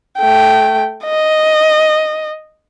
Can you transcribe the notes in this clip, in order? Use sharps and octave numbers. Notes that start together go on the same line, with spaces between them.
A3 G5
D#5